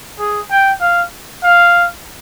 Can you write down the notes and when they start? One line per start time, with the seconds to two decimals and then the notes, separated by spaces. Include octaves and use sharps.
0.19 G#4
0.50 G5
0.81 F5
1.43 F5